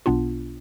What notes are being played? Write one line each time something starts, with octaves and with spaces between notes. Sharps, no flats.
B1 B2 B3 D4 F4